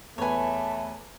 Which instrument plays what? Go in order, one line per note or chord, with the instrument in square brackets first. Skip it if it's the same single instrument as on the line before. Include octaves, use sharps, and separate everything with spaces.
[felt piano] E2 B4 [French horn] A3 [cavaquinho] C#5 G#5 [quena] A5